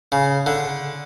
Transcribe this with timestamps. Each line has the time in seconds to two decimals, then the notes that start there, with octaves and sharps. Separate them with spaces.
0.12 C#3
0.46 D3